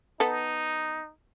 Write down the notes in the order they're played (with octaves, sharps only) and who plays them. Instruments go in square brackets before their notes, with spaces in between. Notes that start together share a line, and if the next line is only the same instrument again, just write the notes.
[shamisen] B3 A4 [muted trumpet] D#4